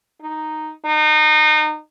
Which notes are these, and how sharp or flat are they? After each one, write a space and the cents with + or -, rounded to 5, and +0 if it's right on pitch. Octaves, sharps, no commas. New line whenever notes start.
D#4 -5
D#4 -30